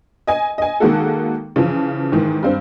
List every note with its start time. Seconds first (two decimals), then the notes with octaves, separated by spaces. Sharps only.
0.27 D#5 G#5
0.58 D#5 G#5
0.80 D#3 G#3 A#3 F#4 A4
1.56 C#3 E3 F3
2.12 G#2 D#3 E3
2.43 G2 C4